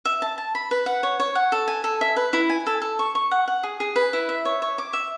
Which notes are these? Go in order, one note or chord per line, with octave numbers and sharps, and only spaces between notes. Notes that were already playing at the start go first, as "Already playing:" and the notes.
E5
A5
A5
B5
B4
F#5
C#5
C#5
F#5
A4
G#5
A4
E5
B4
E4
G#5
A4
A4
C#6
C#6
F#5
F#5
G#4
G#4
B4
E4
E5
C#5
C#5
D6
E5